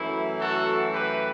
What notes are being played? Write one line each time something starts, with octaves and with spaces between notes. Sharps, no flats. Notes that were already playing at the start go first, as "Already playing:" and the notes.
Already playing: F#2 E3 A3 E4
F#4 A4
G4 B4